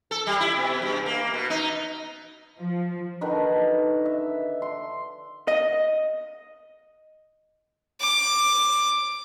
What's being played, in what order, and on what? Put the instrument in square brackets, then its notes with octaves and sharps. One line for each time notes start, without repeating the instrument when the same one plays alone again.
[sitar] A4
G3
E4
B2
G2
A#3
B2
D#4
[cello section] F3
[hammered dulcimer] D3 D#3 B4 D#5
E5
C6
[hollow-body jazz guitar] D#5
[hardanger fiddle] D6